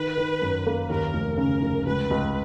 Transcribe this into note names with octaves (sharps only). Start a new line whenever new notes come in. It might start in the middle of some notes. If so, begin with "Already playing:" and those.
Already playing: D#3 B4
D#3
F#2
A#3
D#2 A#4
F1
C#3 A#4
F1
C#2 B4
C#2